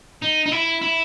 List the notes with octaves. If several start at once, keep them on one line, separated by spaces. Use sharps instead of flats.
D#4
D#4
E4
E4